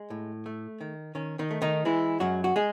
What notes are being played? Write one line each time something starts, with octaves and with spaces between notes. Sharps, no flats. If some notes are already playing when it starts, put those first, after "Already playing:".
Already playing: G#3
A2
A3
D#3
D#3 C#4
D#3 D#4
A3
D#3 D#4
E3 G#3 E4
F#2 F#3 F#4
F#4
G#3 G#4